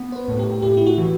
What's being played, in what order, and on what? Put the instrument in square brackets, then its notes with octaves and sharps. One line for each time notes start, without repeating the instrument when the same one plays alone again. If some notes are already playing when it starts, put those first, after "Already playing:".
Already playing: [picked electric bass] B3
[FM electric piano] C5
B4
[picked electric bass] A2
[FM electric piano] G4
[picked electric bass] A2 [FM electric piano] G4
[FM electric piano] E4
F#4
[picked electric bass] E3